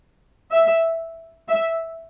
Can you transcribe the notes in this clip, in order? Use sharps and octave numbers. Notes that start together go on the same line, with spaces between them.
E5
E5